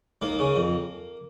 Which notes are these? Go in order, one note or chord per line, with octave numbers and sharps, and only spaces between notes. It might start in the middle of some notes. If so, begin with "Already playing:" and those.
D#2 A#3
C#3
F2